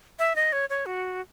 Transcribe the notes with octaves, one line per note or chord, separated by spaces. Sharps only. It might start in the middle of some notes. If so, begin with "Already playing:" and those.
E5
D#5
C#5
C#5
F#4